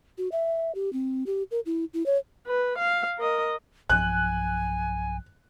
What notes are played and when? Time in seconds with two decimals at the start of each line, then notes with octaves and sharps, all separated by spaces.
0.18 F#4
0.32 E5
0.75 G4
0.93 C4
1.27 G4
1.51 A#4
1.66 E4
1.94 E4
2.06 C#5
2.47 B4
2.78 F5
3.18 A#4 D#5
3.90 B1 G2 F3 G#5 F#6